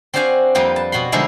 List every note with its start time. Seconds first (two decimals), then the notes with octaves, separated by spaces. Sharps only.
0.14 C4 D4 F#4 C5 F5 G#5
0.55 F2 G3 A#3 F4 G4 B4
0.76 A5
0.92 B2 F#4 B5 C6
1.12 D3 F3 G3 G#3 D#4 E4